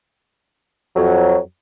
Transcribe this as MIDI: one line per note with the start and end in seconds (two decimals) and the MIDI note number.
0.96 1.37 41
0.96 1.37 54